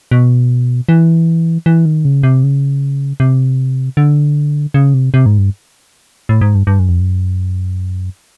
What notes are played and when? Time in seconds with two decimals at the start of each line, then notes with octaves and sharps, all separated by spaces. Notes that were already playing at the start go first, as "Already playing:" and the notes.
0.11 B2
0.89 E3
1.66 E3
1.85 D#3
2.05 C#3
2.23 C3
2.44 C#3
3.20 C3
3.97 D3
4.74 C#3
4.94 C3
5.14 C3
5.26 G#2
5.38 G2
6.29 A2
6.41 G#2
6.55 G2
6.67 G2
6.79 F#2
6.89 F2
7.00 F#2